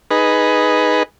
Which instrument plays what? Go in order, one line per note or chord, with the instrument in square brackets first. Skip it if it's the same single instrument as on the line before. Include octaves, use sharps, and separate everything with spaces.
[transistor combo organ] D#4 G#4 B4